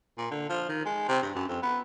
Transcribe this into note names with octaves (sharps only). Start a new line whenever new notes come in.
A#2
D3
F3
D#3
G#3
C3
G2
F#2
F2
B3